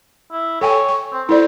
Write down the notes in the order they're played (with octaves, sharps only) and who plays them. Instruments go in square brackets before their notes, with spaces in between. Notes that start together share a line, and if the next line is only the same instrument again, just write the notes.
[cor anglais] E4
[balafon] A4 G5 G#5 [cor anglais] C#5
[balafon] C#6
[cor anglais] C4
[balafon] E4 A4 D5 [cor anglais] C5